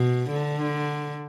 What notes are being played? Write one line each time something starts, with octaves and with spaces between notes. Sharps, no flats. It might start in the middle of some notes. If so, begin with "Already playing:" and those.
Already playing: B2
D3